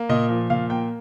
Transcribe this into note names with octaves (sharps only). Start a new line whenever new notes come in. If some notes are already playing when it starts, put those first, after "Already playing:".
Already playing: A#3
A#2 D#5
F3
A#2 F5
A#3 G5